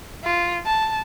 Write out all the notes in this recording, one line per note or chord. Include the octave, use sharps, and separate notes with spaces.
F4
A5